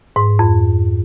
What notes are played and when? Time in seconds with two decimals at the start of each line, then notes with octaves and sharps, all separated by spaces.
0.16 G#2
0.39 F2